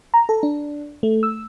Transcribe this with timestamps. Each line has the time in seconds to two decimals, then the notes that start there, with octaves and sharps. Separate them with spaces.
0.14 A#5
0.29 A4
0.43 D4
1.03 A3
1.23 E6